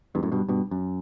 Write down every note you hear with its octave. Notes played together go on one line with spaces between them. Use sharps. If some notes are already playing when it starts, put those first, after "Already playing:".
E2 G2
F#2 A2
G2 B2
G2 B2
F#2